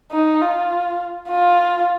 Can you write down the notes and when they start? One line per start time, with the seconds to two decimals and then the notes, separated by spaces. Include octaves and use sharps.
0.12 D#4
0.42 F4
1.29 F4